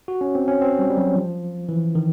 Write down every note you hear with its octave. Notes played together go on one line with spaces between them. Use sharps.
F#4
C#4
C4
C#4
C4
G3
G3
F#3
F3
E3
D#3